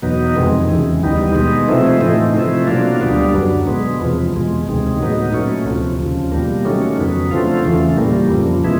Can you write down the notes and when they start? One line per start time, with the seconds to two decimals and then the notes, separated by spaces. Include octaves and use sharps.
0.02 E2 B2 F#3 B3 D#4
0.36 F2 C3 D#3 G#3
0.69 E2 C#3 E3
1.02 D#2 D#3 G3 B3 D#4
1.35 B2 G#3 B3 D#4
1.68 C3 F3 A3 C4 E4
2.01 A2 E3 A3 C4 D#4
2.35 C3 F3 A3 C4 E4
2.67 B2 F#3 A#3 D4 F4
3.01 D2 D3 G3 B3 D4
3.33 F#2 D3 F#3
3.67 B2 G#3 B3
4.00 E2 C3 F3
4.33 E2 B2 G#3
4.67 D2 C3 D#3 G#3
4.99 A2 F#3 B3 D#4
5.33 A#2 F#3 A3 C#4
5.65 D2 C3 F3
5.99 D#2 C#3 F3
6.32 B2 G3 A#3
6.65 D#3 F#3 A3 C#4
6.98 F2 C#3 F#3 B3
7.31 D3 F3 A3 C4 F4
7.63 E2 C#3 E3 A3
7.97 A#2 G3 A#3
8.30 F2 C#3 F3
8.64 B2 G#3 B3 E4